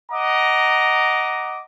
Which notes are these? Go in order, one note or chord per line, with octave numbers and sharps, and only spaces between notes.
D#5 F#5 A#5 D6